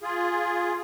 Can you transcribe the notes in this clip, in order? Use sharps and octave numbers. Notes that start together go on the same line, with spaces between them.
F4 G#4